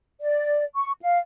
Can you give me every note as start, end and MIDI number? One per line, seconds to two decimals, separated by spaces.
0.21 0.63 74
0.75 0.92 85
1.01 1.19 77